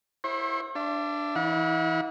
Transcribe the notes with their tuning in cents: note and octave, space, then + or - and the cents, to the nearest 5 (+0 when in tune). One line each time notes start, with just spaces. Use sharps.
E4 +0 C5 +40 C#6 -45
D4 +0 E5 +40
E3 +0 E4 -40 F#5 -45